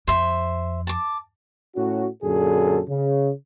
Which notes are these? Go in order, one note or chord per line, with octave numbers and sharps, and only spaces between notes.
F2 C5 E5
A5 D6
A2 C#4 F#4
F#2 A#2 D3 G#4 A4
C#3